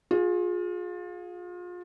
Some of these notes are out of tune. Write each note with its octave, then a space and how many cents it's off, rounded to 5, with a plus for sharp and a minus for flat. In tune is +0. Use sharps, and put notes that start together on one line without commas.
F4 +30 G#4 +0